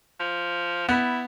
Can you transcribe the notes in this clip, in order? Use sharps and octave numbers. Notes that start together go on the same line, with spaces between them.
F3
B3 E4